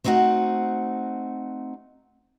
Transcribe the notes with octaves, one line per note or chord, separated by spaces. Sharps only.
A3 C4 D#4 F#4 F#5